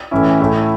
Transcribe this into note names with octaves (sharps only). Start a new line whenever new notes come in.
A2 E3 C#4 E4
A2 A3 E4